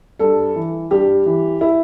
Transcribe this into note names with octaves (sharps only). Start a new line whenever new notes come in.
G2 A4
E3
G2 G4
E3
E4